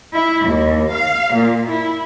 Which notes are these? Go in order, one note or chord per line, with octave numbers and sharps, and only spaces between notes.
E4
D#2
F5
A#2
E4